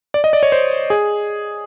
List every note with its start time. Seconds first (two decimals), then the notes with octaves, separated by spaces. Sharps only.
0.14 D5
0.24 D#5
0.33 D5
0.43 C#5
0.52 C5
0.90 G#4